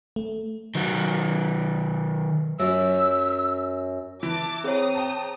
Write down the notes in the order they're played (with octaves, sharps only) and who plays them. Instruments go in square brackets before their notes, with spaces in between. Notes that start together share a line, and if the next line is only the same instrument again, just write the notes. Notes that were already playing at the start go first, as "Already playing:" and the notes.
[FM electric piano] A3
[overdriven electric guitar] D#3 F#3
[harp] F#2 [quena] E6
[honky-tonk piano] E3 [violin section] A5 D6
[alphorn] C4 [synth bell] G#4 C#5 [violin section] A#5 D#6
[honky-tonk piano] G5 A5